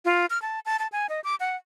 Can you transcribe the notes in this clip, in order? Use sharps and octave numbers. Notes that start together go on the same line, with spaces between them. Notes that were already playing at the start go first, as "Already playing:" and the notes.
F4
F6
A5
A5
A5
G#5
D#5
D6
F#5